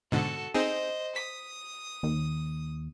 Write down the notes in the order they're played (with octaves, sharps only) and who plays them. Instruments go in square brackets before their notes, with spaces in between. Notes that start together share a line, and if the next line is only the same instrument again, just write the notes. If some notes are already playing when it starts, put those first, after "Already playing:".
[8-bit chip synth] G#2 B2 D3 [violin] F#4 A4
[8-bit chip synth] C4 D#4 G#4 [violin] C5 D#5
[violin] D#6 [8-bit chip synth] B6
[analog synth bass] D#2